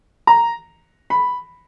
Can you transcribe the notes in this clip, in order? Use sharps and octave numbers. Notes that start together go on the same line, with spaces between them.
A#5
B5